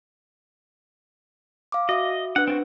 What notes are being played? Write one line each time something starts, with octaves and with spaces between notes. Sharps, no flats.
F5 D6
F#4 D#5 E5
D4 B4 F#5
C4 F4 F#4